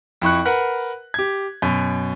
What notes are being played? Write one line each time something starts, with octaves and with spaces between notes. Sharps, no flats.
F2 E4 C#6 F#6
A#4 B4 F#5
G4 G#6
F#2 B2